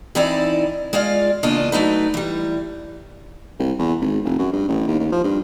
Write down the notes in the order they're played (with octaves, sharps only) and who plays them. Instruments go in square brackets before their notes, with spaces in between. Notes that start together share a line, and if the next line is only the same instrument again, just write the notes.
[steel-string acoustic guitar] E3 C4 D#4 E4 D5
G#3 F4 D5 F5
E2 C#3 A#3 D4 F4 D#5
F#3 A3 D#4 B4
E3 G3
[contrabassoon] C2
E2
G#1
F1
F#2
G2
A1
D#2
D#2
F3
G2